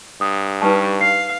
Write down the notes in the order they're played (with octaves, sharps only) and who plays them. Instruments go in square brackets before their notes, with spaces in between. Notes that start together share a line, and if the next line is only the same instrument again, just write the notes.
[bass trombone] G2 [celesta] D#6
[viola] G3 C#6 [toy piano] D#4 B4 A5
[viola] F5 [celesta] C7